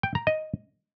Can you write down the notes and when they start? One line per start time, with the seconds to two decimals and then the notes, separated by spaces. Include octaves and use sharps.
0.03 G5
0.15 A#5
0.27 D#5